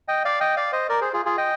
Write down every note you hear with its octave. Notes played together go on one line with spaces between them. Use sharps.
D#5 G5
D5 F5
D#5 G5
D5 F5
C5 D#5
A#4 D5
G#4 C5
F4 G#4
F4 G#4
D#5 G5